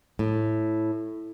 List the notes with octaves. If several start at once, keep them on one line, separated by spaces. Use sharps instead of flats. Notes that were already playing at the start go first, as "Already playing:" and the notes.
A2